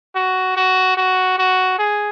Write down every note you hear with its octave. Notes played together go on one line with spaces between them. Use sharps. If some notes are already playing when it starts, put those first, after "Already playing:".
F#4
F#4
F#4
F#4
G#4